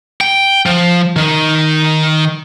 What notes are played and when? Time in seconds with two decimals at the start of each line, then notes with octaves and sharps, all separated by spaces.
0.21 G5
0.66 F3
1.16 D#3